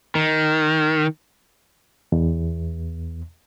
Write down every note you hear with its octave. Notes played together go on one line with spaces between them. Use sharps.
D#3
E2